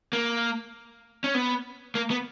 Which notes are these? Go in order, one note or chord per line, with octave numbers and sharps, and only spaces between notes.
A#3
C#4
B3
A#3
B3